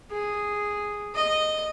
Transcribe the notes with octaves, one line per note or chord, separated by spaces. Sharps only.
G#4
D#5